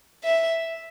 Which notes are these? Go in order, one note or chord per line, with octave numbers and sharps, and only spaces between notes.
E5